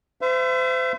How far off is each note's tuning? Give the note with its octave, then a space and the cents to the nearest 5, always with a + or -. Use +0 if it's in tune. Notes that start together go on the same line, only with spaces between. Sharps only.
C5 -35 E5 +35